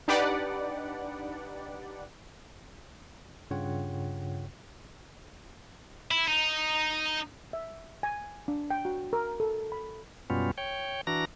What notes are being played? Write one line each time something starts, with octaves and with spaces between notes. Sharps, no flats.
D4 D#4 G4 B4 D5 F#5
G2 C#3 F4 C#5 F#5 G5
E4
D#4
E5
G#5
D4
G5
F#4
A#4
A4
B5
F#2 B2 G3 B3 C#4 F4
C#5 G5
E3 D4 F#4 A#5 A#6